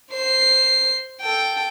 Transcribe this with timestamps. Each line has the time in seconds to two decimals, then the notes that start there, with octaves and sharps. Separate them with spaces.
0.13 C5 C7
1.22 A4 G5